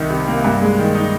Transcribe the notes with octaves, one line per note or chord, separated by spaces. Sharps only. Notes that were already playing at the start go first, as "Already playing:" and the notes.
Already playing: C2 D#3
C3
A#3
G2
G#3
D#3
D#4